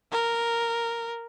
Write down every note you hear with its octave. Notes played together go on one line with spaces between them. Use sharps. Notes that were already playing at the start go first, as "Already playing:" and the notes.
A#4